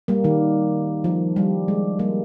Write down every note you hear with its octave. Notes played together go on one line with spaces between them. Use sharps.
G3 A#3
D#3
F3
G3
G#3
G3 A#3